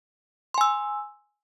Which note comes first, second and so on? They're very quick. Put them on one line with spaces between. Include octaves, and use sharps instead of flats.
C6 G#5 E6